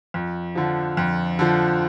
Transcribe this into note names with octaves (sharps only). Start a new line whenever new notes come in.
F2
D3 F3
F2
D3 F3